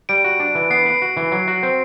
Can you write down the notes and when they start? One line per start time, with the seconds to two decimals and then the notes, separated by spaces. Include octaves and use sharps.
0.09 G3 D7
0.24 F#4
0.40 D4
0.55 E3
0.70 B3 C7
0.86 B4
1.02 F#4
1.17 E3
1.32 F#3
1.48 F#4
1.63 C4